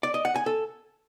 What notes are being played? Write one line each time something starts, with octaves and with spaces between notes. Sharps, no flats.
D5
D#5
F#5
G#5
A4